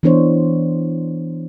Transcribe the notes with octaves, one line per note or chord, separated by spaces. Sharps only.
E3 B3 D4 C5 C#5